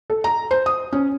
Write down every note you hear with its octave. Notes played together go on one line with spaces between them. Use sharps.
A4
A#5
C5
D#6
C#4